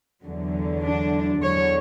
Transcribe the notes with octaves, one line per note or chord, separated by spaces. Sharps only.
E2 D3 F#3
D4
E2 D3 F#3 C#5